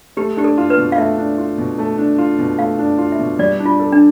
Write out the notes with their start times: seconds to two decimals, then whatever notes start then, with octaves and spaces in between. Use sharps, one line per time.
0.17 A3 G4
0.37 D4 G4
0.44 A4
0.58 F4
0.70 B4
0.77 B2
0.92 F5
0.98 A3 E5
1.18 D4
1.38 F4
1.58 B2
1.78 A3
1.98 D4
2.18 F4
2.38 B2
2.59 A3 F5
2.78 D4
2.98 F4
3.12 E5
3.19 B2
3.39 G3 D5
3.59 D4
3.66 F4
3.80 A4
3.92 D4